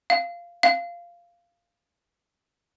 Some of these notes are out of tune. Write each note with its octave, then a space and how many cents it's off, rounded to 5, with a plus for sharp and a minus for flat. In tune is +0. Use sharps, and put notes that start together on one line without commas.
F5 -10
F5 -10